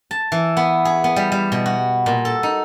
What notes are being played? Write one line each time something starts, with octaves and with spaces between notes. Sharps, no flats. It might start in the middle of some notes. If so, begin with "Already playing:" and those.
A5
E3
B3
G#4
B3
G3
G3
B2
F#4
A#2
A4
D#4